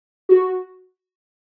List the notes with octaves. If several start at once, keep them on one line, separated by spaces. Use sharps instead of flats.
F#4